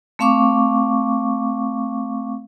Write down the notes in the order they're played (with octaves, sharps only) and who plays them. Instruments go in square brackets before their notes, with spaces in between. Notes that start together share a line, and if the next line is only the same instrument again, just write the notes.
[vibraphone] A3 C4 F5 C#6 D6